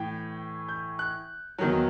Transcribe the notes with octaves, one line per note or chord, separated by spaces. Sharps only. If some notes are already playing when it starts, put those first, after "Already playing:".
Already playing: A2 E3 G5
G6
F#6
E2 D#3 F#3